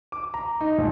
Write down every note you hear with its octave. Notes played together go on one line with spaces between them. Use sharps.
D6
A#5
D#4
A#1